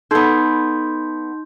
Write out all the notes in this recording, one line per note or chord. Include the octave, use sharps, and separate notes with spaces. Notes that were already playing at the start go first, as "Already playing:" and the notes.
B3 D#4 A4 C6 G6